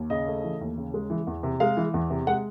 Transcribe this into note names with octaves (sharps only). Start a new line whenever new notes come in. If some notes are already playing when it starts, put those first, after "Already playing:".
Already playing: D#2
C#3 D#5
A3
E3
D#2
C#3
G#3
E3
E2
C3
G#3 F5
E3
E2
C3
G#3 F#5